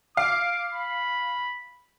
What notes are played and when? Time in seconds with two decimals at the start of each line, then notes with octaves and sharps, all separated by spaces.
0.17 F5 D6
0.74 B5